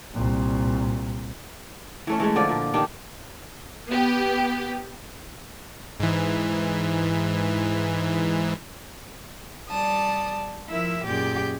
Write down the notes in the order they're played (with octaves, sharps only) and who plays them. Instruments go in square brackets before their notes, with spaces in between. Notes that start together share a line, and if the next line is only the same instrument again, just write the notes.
[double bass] C2 A#2
[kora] E3 A3 C#4
E3 G#3 A3
D3 F3 D5
A#2
D#3 D4 G4
[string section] B3 G4
[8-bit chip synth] G#2 E3
[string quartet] G3 D5 A5 D#6
F3 E4 A#4 E5
F#2 A#2 G4 G#4 D5 G6